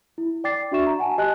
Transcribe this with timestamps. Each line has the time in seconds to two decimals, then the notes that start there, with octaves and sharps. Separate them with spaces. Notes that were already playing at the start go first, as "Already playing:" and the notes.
0.18 E4
0.44 D5 G5 D6 A6 C7
0.72 D4 F#4 E5 C#6 E7
0.87 A#5
0.99 F#5 G#5 A5
1.18 G4 D#5 G#5 A5 F#6